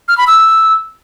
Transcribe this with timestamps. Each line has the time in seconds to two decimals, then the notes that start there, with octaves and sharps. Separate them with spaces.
0.08 F6
0.18 B5
0.27 E6